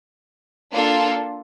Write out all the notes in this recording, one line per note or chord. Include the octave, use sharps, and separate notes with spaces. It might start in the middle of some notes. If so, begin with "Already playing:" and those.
A#3 D4 F4 A4